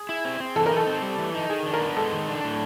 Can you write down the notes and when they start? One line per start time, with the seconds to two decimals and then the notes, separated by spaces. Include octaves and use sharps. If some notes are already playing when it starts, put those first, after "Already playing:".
Already playing: G#4
0.09 E4
0.25 C4
0.40 C4
0.56 E3 A4
0.66 A#4
0.71 D#4
0.77 A4
0.87 C4
1.02 G3
1.19 E3
1.34 D#4
1.50 D#3 G#4
1.66 D4
1.73 A#4
1.80 B3
1.96 G#3 A4
2.12 D#3
2.28 D4
2.44 A2